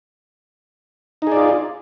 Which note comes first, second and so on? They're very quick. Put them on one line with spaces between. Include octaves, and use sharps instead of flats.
D#4 G#4 D5 F4